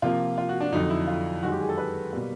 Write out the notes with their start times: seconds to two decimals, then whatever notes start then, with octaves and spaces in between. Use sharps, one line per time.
0.02 C3 F3 A#3 F4
0.38 F4
0.49 F#4
0.60 D4
0.72 F2 D3 F#3 D#4
0.90 E4
1.07 F4
1.43 F#2 D#3 G#3 F#4
1.52 G4
1.61 G#4
1.69 A4
1.78 B4
2.13 B2 G3 A#3